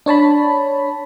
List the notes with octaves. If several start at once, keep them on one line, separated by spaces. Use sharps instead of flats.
D4 C#5 A5 B5